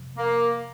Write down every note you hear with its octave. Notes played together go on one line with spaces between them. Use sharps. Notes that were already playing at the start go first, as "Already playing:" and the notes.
Already playing: F2 C3 F3
A#3